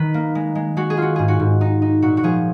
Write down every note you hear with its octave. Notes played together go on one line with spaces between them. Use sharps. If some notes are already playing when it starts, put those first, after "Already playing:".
Already playing: D#3 B4
A#3
G#3
G#3
G#3 F#4
G#4
F4 F#4
G#2 G#4
F#4
G#2
D#4
D#4
A#2 F#4
F#4
F3 G#4